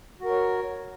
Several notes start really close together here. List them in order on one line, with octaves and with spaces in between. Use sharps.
F#4 A#4 C#5